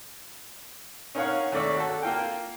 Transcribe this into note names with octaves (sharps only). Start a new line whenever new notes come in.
C#4 D#4 A#4 C#5 F5 F#5
D#2 A3 C#4 D5 C#6 E6
F#4 A4
A#3 F4 G5